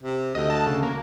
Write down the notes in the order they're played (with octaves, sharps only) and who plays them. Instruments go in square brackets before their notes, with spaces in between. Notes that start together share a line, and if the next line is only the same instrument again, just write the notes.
[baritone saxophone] C3
[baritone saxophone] D2 [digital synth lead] D#5
[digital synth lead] A5
C#3
A#3